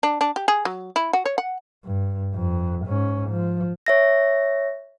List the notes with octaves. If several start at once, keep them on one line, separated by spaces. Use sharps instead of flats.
D4
D4
G4
G#4
F#3
E4
F#4
C#5
F#5
G2
F2
G#2 C#4
F3
C#5 E5 A#6